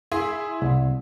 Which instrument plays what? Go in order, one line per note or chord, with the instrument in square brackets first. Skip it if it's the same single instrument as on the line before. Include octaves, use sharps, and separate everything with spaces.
[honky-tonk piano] E4 G#4 C6
[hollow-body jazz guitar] C2